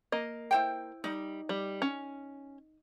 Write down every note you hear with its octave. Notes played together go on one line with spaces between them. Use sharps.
A#3 D#5
E4 C5 G5
G3 D#4
G3
C#4